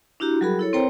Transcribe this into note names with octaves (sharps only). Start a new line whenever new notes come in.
D4 E4 F#4 G4 A#5
F#3 G3 F#4 G#4 A#4 B5
E4 A4 C#5
C4 A#4 C5 C#5 G5 A#5